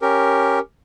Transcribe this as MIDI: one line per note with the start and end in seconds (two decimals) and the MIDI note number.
0.02 0.59 61
0.02 0.59 67
0.02 0.59 70